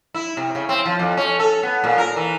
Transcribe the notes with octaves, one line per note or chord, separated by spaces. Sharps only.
E4
C3
C#3
C4
F3
F2
C#4
A4
B3
A#2
A#4
E3